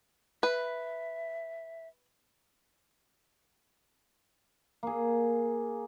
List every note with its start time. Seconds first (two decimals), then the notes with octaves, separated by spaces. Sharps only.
0.43 B4 E5
4.83 A#3 G#4